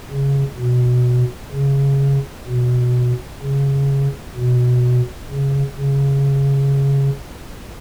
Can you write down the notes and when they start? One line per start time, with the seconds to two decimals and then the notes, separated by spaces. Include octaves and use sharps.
0.11 C#3
0.58 B2
1.53 C#3
2.47 B2
3.42 C#3
4.36 B2
5.31 C#3
5.78 C#3